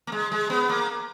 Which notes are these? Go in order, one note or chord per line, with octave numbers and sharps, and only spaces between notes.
A#3
G#3
G#3
B3
A#3